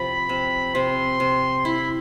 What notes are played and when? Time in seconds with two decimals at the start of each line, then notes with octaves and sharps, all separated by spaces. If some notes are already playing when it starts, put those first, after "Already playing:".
Already playing: C3 F3 B5
0.29 C3
0.75 C3 C6
1.20 C3
1.65 E4 B5